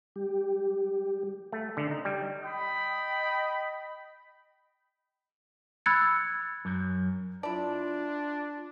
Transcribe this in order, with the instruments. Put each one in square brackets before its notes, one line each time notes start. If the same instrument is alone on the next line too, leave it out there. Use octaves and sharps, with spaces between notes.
[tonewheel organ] G3 G4
[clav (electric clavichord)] A3
D3
D#4
G3
[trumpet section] D#5 G5 B5
[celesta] B5 E6 F#6 G#6 A6 C#7
[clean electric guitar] F#2
[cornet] D4 [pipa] E4 D5 [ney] F4 [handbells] A5